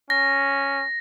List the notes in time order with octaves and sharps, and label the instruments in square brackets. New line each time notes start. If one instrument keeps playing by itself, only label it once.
[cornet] C#4 [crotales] A#6